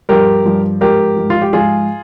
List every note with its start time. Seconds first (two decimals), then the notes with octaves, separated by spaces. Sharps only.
0.09 G2 F3 G4 A#4
0.45 G2 F3
0.81 G#2 F3 G4 A#4
1.16 G#2 F3
1.30 F4
1.42 G4
1.53 G#2 F3 F4 G#4